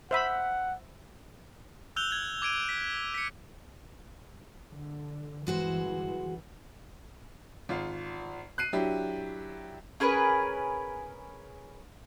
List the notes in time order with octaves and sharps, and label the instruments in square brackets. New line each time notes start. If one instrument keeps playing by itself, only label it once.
[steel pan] C5 E5 B5 [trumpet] F#5
[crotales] E6 F#6 G6 F7 G7
G#6 G7
D6 G#6 D7 D#7
B6
B6 C#7
[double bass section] D3
[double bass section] G1 E3 [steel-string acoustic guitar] G#3 F#4 C5
[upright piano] G#1 F4
F#6 C7 D#7
F#3 D4 E4 G4
[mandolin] C#4 G#4 A#4 B4